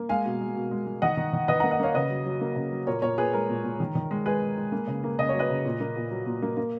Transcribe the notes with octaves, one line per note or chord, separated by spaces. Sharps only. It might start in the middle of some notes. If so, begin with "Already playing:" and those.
Already playing: A#3
G#3 F5 G#5
B2
G#3
B2
G#3
G#3
D#3 D#5 F#5
D#3
D#3
D#3 B4 D#5
A#3 F#5 A#5
D#5 F#5
A#3 C#5 F5
C#3 B4 D#5
F#3
F#3
A#3
C#3
F#3
A#2 A#4 C#5
A#2 A#4 C#5
A#2 G#4 B4
G#3 A#4
A#2
A#2
D#3
D#3
G#3
G#3 G#4 B4
G#3
G#3
A#3
C#3
A#3
C#3 D#5
F#3 C#5
B4 D#5
C#3
A#2
A#3
A#2
F#3
A#2
A#3
A#3